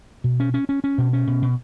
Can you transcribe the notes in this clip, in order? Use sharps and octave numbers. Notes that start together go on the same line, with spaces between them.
B2
C#4
C#4
C#4
C#4
B2
C#4
B2
B2